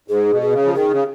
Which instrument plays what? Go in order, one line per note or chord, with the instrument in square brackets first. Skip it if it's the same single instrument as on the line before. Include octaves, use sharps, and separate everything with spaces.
[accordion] G#2 [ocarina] G#4
[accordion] B2
[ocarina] G#4
[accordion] C#3
F3
[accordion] D#3 [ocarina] G#4
[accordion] C#3